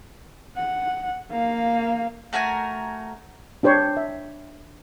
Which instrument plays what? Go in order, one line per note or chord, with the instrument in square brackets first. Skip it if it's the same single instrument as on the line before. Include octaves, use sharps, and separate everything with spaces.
[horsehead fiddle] F#5
A#3 F5
[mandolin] A3 F#4 A#4 G#5
[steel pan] D4 G4 C5 C#5
E5